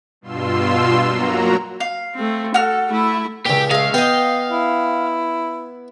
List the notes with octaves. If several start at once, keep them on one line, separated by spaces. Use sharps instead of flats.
G2 B2 F4 C6 E6
F#3 A#3 F#4 A#5
F5
A3 C4
F#4 A4 F6
A3 E4
C#2 A#2 G4
G#3 A3 F5
B3 D#5 G5
E4